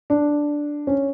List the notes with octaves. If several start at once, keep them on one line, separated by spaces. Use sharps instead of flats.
D4
C#4